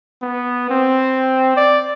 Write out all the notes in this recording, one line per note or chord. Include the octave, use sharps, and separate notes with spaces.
B3
C4
D5